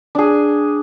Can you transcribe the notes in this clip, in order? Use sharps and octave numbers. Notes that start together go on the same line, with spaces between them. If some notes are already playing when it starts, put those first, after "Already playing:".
D4 G#4